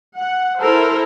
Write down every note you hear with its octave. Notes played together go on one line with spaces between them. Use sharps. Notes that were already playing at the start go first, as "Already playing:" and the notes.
F#5
E4 A4 A#4 C5